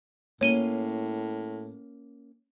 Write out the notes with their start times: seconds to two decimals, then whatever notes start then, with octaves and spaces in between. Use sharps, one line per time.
0.41 A2 A#3 C#4 C#5 D#7 G7